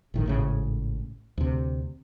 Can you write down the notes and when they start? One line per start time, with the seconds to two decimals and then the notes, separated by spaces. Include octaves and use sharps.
0.14 G1 A2 D#3
0.26 G#1 A2 C#3
1.38 D2 C3